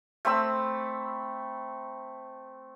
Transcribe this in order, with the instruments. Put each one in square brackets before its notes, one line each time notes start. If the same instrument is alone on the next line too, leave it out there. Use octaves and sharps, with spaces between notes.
[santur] A3 C4 B5 E6